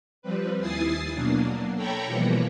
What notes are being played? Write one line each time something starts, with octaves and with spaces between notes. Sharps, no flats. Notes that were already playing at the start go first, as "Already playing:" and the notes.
F3 G3 C4 B4
D#2 E4 G#5 D#6 A6 C7
B2 F#3 A#3 D4
A4 C#5 G5 A#5 B5 C#6
B2 E3 F3 G3 A#3